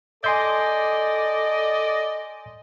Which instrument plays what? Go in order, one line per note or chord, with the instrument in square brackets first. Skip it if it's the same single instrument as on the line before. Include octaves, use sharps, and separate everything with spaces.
[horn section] A4 D5 D#5 [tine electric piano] G#5 C6 G6